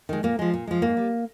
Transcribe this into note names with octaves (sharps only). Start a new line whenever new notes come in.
D#3 G#3
A#2 A#3
F3 G#3
A#2
F3 G#3
G#2 A#3
G3